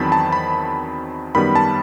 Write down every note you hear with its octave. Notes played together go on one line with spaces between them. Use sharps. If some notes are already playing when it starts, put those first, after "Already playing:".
Already playing: E2 D#3 F#3 C4 A5 B5
A5
B5
F#2 D#3 G3 B3 B5
A5